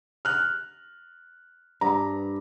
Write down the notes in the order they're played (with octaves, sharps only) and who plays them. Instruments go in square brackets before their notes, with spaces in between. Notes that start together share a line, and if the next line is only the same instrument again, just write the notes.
[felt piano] F6 F#6
[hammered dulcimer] G2 [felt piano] A#5